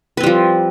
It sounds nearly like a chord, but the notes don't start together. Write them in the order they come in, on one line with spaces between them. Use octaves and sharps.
B4 C4 G3 F3